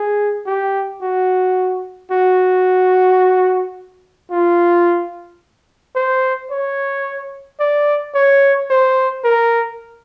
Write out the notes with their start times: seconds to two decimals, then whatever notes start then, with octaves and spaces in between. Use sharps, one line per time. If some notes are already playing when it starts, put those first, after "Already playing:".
Already playing: G#4
0.46 G4
1.02 F#4
2.11 F#4
4.31 F4
5.96 C5
6.51 C#5
7.60 D5
8.15 C#5
8.70 C5
9.24 A#4